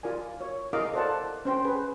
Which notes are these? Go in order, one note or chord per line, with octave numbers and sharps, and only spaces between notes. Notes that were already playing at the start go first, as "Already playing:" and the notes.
F4 A#4 D5 G#5
C#5
E4 G#4 A#4 D#5 F5 D6
A4 A#4 C5 D5 F#5 A5
C#4 C5 G5
G#4 B4